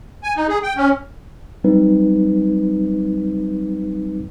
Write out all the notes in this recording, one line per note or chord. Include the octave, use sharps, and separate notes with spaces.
G#5
D#4
G#4
G5
C#4
F#3 G3 C4 D#4 B4